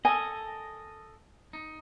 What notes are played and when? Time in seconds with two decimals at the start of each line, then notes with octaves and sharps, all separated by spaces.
0.05 A4 A#4 D#5 G#5
1.53 D#4